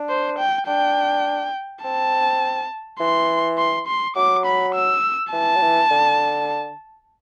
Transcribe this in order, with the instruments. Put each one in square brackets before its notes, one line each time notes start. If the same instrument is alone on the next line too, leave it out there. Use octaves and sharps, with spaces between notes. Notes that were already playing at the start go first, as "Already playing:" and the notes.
Already playing: [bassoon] D4
[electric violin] C5
G5
[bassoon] D4 [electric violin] G5
[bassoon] C4 [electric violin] A5
[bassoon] E3 [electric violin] C6
[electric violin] C6
C6
[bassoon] F#3 [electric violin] D6
[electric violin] B5
E6
[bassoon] E3 [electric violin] A5
[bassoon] F#3
E3
D3